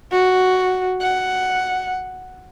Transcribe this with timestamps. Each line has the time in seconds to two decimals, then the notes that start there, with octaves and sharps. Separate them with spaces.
0.12 F#4
1.02 F#5